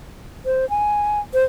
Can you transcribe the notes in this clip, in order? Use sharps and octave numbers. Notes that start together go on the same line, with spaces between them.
C5
G#5
C5